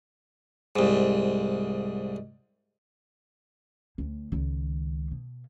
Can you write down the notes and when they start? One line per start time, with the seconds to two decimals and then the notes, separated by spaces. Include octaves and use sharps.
0.76 C2 G#2
3.98 D2
4.32 C#2 D#3
5.11 B2